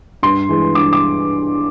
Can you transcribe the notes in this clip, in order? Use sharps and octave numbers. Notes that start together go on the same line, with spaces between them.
G2 C6
E3 G#3
G2 D6
D6